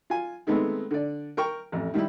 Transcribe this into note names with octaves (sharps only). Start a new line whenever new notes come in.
F4 G#5
D#3 G#3 A3 B3 C4
D3 D5
A#4 G5 C#6
A1 F2
D#3 G3 D#4 E4